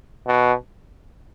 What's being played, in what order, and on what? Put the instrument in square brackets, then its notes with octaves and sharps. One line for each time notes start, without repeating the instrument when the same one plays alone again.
[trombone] B2